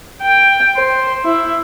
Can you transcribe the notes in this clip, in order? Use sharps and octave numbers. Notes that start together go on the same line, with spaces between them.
G5
C5
E4